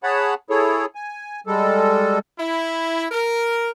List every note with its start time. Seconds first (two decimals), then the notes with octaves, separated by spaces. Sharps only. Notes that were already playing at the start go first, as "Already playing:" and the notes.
0.03 G#4 C#5 F#5 A5 B5
0.50 E4 G#4 A4 C#5
0.95 G#5
1.47 G3 G#3 A4
2.39 E4
3.11 A#4